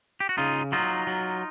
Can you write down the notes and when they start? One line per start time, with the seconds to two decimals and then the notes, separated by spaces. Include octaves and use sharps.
0.20 G4
0.29 F#4
0.38 C#3 D#4 F4
0.72 F#3 D#4 F4
1.07 F#3